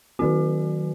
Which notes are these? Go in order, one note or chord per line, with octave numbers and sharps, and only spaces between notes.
D#3 F#3 C4 F#4